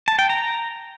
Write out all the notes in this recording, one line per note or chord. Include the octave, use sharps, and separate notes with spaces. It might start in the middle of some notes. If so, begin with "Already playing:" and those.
A5
G5
A#5